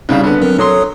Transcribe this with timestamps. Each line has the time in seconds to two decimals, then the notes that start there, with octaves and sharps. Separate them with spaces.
0.09 C2 C#3 G3 D#4 F5
0.24 D3 B3 D4
0.42 F#3 C4 A#4
0.58 F#3 A4 C#5 C6 D#6